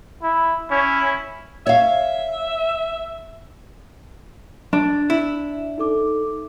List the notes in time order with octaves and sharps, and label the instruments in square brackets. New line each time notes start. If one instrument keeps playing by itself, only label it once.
[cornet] E4
[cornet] C#4 [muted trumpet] E4
[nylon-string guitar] C#5 F5 [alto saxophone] E5
[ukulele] D4
[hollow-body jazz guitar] E4
[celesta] D#4 A4 D6